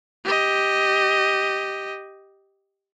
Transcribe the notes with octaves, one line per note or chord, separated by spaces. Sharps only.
G4 D#5